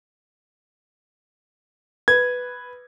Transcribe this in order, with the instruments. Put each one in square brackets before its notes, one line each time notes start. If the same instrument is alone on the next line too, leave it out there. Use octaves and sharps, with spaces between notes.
[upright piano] B4 [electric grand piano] G#6